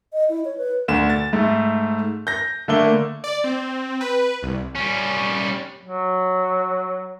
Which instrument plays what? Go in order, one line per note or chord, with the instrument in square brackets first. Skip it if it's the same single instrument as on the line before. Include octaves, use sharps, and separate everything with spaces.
[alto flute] D#5
E4
C#5
B4
[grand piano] D2 E7
A6
G#2 A3
G6 A#6
D3 A3 A#3 G7
[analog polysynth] D5
C4
B4
C2
[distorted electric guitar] G3 C#4
[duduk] F#3